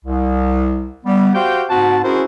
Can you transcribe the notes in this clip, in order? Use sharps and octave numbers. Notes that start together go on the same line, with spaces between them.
C2
G3 B3
F#4 G4 C5 F5 G5
G#2 C4 F#4 F#5 A5
C#4 E4 F#4 G#4 A#4 C5